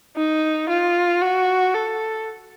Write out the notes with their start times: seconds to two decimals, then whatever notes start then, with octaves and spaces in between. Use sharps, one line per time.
0.16 D#4
0.69 F4
1.21 F#4
1.74 A4